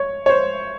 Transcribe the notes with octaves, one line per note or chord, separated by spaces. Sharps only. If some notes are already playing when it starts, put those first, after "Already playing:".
Already playing: C#5
C#5
C5